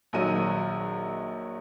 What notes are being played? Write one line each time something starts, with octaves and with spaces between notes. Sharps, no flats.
A#1 D#3 F#3 D#7